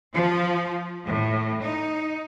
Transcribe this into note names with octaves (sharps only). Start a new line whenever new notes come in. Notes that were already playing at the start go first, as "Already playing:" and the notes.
F3
A2
D#4